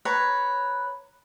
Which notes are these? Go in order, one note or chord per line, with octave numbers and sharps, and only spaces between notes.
B4 C#5 A#5